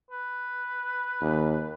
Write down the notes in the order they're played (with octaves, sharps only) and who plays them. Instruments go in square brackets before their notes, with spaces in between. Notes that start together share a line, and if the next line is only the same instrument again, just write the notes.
[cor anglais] B4
[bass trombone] D#2